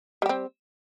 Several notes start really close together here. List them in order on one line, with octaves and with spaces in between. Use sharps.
G3 G4 C4